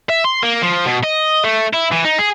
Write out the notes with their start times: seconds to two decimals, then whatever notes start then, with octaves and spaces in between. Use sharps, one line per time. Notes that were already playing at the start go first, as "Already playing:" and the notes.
0.10 E5
0.24 C6
0.43 A#3
0.62 F3
0.86 B2
1.04 D#5
1.44 A3
1.73 E4
1.92 E3
2.04 D#4
2.19 G#4